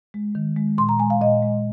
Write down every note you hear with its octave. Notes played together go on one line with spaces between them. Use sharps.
G#3
D#3
G#3
A#2 C6
A#5
G#3 G#5
F5
A#2 D#5
G#3